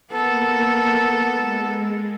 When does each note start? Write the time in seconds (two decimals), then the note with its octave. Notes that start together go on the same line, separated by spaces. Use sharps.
0.12 A#3 B3 A4 A#4
1.29 G#3